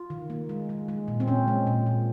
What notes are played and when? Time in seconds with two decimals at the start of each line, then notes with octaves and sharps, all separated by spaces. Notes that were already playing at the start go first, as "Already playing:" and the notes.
Already playing: F4
0.10 D#3
0.30 A#3
0.49 G#3
0.69 G#3
0.88 G#3
1.08 A#2
1.20 C4
1.28 A#2 C#4
1.48 G#3
1.67 A#2
1.86 A#2